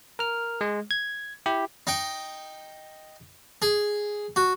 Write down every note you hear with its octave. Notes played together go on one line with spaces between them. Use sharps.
A#4 F6
G#3
G#6
E4 G4
D#4 G5
G#4
F#4